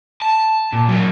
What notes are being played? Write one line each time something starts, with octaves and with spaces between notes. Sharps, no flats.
A5
A#2
F#3 A#3